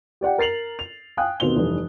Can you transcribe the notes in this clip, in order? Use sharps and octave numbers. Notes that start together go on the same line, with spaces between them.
G4 D5 F#5 G5
A#4 A6 C7 F7 F#7
F7
F5 G5 G#5 D#6 F#6
D#2 B2 C4 F7 G7
F1 G2 E3